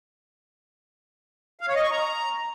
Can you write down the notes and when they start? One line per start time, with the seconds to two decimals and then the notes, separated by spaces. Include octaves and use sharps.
1.61 F5
1.68 C#5
1.76 D#5
1.83 C#6
1.91 A#5